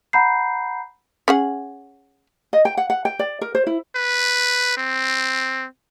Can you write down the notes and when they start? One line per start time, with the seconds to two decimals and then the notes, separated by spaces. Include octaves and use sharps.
0.13 F#5 A#5 B5 G6 C7
1.28 C#4 G#4 F#5
2.53 D#5
2.65 G5
2.77 F#5
2.90 F#5
3.05 G5
3.19 D5
3.41 A#4
3.55 C5
3.67 E4
3.95 B4
4.77 C4